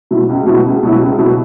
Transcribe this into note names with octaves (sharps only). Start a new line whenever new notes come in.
B2 F#3 E4
C#2
B2 F#3 E4
C#2
B2 F#3 E4
C#2
B2 F#3 E4